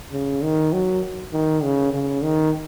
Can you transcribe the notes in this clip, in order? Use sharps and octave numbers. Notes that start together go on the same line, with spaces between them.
C#3
D#3
F#3
D#3
C#3
C#3
D#3